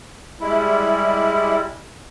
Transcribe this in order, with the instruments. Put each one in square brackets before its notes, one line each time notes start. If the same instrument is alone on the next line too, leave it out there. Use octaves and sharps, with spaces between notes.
[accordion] G3 G#3 E4